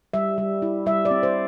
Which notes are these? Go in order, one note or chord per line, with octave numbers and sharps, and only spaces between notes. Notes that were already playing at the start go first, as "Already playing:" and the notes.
G3 E5
G3
E4
G3 E5
D5
C4
C5